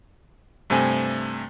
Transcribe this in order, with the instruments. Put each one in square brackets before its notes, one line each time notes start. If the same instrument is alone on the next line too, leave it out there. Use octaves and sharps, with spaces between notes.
[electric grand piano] G2 C3 A3 C4 G#5